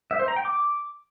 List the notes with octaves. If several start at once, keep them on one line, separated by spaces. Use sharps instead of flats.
E5
C5
A#5
G5
D6